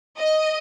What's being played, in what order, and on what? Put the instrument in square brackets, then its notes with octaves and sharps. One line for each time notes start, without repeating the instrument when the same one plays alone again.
[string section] D#5